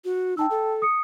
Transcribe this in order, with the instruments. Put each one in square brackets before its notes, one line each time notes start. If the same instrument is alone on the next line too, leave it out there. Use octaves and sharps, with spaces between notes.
[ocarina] F#4
[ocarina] D#4 [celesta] G5 A5 E6
[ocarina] A4
[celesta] D#6 C#7